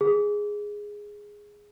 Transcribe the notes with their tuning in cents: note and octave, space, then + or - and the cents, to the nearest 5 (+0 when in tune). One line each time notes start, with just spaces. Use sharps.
G#4 -5